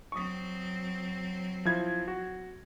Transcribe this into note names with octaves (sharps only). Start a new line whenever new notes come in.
F#3 C4 C#6 D#6
F3 E4 G#6
F#4